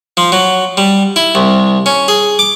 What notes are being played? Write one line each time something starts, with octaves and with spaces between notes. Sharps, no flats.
F3
F#3
G3
E4
C2
C#4
G#4
D6